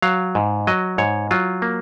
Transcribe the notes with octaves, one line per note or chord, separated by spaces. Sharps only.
F#3 F5
G#2
F#3 D#5
G#2 C#5
F#3 F4
A#3